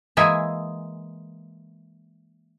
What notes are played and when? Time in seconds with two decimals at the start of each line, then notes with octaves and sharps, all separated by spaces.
0.17 E3 G#3 A#3 G#4 E5 G#5